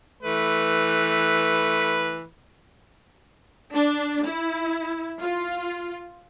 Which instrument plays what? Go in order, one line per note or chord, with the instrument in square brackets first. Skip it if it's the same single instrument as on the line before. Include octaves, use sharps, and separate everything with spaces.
[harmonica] E3 A3 B4
[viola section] D4
E4
F4